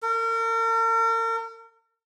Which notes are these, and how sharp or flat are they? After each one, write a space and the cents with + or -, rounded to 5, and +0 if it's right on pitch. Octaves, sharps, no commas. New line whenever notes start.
A#4 -40